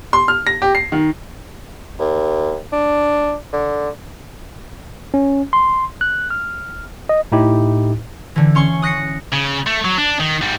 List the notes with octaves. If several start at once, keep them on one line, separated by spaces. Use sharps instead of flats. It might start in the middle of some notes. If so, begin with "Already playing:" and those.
C6
F6
A#6
G4
C7
D#3
D#2
D4
D3
C#4
C6
F#6
F6
D#5
A2 D#4 E4 G4
D3 E3
C#4 C6 C#6
D#6 F#6 A#6 C7 C#7
C#3
A3
F#3
D4
D#3
G#2 G3